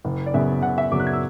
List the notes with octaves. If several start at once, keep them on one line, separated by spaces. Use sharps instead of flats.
F#1
D5
F#2 C#3 F#3 B3 E5
F#1 F#5
E5
F#2 C#3 F#3 B3 D6
F#6
G#6
E6